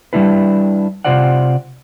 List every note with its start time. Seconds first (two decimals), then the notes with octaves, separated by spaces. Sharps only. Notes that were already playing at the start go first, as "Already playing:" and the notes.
0.13 G3 G#3 D4 E4 B4
1.05 C3 G#3 F4 C5 D5 F#5